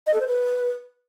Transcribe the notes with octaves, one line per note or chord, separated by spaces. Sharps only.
D#5
A4
C5
B4